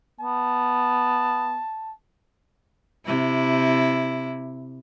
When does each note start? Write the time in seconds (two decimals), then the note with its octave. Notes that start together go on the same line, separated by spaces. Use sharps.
0.20 B3 A5
3.06 C3 E4